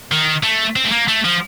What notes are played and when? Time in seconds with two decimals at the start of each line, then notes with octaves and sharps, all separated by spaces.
0.12 D#3
0.43 A3
0.76 C4
0.84 A3
0.92 A#3
1.08 A3
1.25 F3